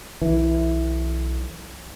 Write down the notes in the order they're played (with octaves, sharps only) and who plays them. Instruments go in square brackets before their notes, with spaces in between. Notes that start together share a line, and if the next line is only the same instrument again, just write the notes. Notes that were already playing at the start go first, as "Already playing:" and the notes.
[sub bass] B1 [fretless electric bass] E3